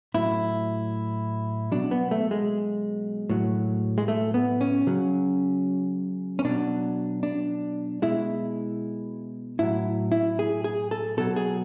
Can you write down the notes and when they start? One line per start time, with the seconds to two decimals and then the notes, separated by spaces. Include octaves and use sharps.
0.14 A2 F#3 E4
1.72 B2 F#3 D4
1.91 B3
2.11 A3
2.31 G#3
3.30 A2 F#3
3.98 G#3
4.08 A3
4.34 B3
4.61 C#4
4.87 C#3 F#3
6.39 C#4
6.45 B2 F#3 D4
7.23 D4
8.02 B2 G#3 E4
9.59 A2 F#3 E4
10.12 E4
10.39 G#4
10.64 G#4
10.91 A4
11.17 B2 F#3 A4
11.36 G#4